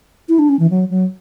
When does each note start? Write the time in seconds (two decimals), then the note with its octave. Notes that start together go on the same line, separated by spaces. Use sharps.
0.29 E4
0.39 D4
0.49 C#4
0.59 E3
0.70 F#3
0.90 F#3